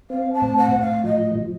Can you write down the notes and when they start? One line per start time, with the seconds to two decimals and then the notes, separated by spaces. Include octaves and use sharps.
0.10 C4 F5
0.33 A5
0.42 A2
0.57 F#5
0.72 A2
0.80 F5
1.04 F3 D#5
1.35 F3